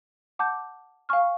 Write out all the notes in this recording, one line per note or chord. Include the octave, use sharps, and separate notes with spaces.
F#5 A5 D6 G6
F5 G#5 C#6 F6